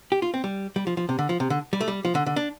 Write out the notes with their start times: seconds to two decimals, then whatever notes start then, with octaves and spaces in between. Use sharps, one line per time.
0.12 G4
0.22 F4
0.34 C4
0.44 G3
0.76 G3
0.87 F3
0.97 F3
1.09 C3
1.19 D3
1.29 F3
1.40 C3
1.50 D3
1.73 G3
1.81 A3
1.88 G3
2.05 F3
2.15 D3
2.26 D3
2.36 D4